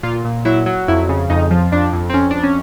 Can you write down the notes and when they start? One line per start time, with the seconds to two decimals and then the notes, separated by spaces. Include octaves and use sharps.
0.03 A#2 F4
0.24 A#2
0.45 F#3 E4
0.66 F#3
0.88 F2 E4
1.09 C#3
1.30 F2 D#4
1.51 F3
1.72 F2 D4
1.93 F2
2.09 C4
2.13 F2 C#4
2.31 F2 D4
2.43 C#4